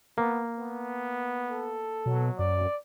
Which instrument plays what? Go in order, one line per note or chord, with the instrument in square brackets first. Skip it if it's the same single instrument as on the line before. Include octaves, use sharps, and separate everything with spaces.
[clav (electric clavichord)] A#3 [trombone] B3
[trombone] B3
[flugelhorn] A4
[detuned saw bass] B2 [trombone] F#3
[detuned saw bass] F#2 [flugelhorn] D5